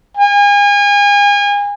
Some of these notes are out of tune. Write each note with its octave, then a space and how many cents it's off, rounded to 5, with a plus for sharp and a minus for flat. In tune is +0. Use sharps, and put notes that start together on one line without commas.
G#5 -35